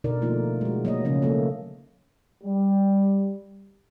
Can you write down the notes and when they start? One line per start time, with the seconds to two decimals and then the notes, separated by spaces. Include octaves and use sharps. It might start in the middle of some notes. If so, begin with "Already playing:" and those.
0.04 B2 D3 D#4 A#4 D5
0.22 F3 A3 A#3 D#4 F4
0.61 G#3 F#4
0.85 F#3 A#3 D#5
1.05 C#3 F3 F#3 A3 C#4
1.22 A3 A#3 A4
2.44 G3